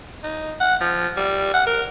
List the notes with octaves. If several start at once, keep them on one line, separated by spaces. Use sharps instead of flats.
D#4
F#5
F3
G3
F#5
A#4